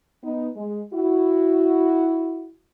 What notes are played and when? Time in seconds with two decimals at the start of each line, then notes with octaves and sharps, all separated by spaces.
0.23 B3 D#4
0.56 G#3
0.93 E4 F#4